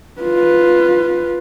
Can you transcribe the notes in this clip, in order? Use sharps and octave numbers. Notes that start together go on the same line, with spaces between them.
F4 B4